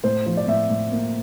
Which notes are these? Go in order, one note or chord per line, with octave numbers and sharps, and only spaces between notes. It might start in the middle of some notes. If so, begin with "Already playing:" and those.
A2 C5
F3
D5
A2 E5
A2
A#3